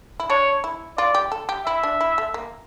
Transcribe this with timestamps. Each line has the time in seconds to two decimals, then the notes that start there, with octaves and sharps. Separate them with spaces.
0.20 E4
0.30 D4 C#5
0.64 E4
0.98 F4 D5
1.14 G4
1.32 A4
1.49 G4
1.66 E4 E5
1.83 D4
2.01 E4
2.18 A3
2.34 A#3